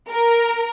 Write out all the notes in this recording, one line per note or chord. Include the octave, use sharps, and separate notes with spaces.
A#4